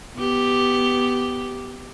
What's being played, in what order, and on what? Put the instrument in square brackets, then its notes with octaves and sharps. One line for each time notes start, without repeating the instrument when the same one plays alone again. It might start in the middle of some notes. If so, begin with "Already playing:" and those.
[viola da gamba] B3 G4